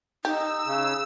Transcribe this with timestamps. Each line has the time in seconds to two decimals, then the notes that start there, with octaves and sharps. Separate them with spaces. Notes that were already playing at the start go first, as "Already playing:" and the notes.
0.25 D#4 G4 E6
0.66 C#3